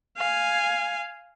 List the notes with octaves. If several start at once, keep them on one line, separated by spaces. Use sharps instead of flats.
F5 G#5